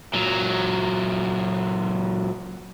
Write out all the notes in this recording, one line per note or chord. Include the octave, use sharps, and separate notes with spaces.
A#2 F#3